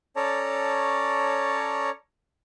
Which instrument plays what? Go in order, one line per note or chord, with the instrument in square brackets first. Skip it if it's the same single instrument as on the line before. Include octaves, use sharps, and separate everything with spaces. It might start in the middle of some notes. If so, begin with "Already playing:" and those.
[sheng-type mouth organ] C#4 A4 C#5 D5 A5 A#5